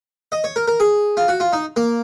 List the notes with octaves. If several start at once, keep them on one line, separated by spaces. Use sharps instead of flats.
D#5
C#5
A#4
A#4
G#4
F4
F#4
F4
D#4
A#3